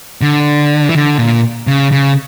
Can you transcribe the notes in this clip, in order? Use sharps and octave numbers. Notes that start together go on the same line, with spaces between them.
D3
E3
D3
A#2
C#3
C#3